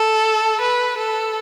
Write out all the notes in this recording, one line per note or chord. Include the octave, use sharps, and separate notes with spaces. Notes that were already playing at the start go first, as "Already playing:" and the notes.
Already playing: A4
B4
A4